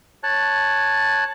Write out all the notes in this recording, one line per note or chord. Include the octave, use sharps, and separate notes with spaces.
C#5 A5 F#6